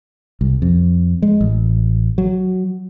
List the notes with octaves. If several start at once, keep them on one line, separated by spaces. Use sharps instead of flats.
C2
F2
G#3
A1
F#3